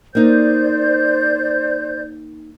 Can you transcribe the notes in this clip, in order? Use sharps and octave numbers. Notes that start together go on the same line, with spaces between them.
A#3 D#4 C5 D5 G6